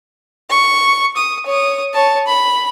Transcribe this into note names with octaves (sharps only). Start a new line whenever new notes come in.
C#6
D#6
C#5 D#6
C#5 A5
B5